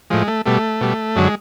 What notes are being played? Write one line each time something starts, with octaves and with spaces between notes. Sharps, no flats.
A2 F3 G#3
A3
B2 G3 A3
B2 G3
F#2 D3 F#3 G#3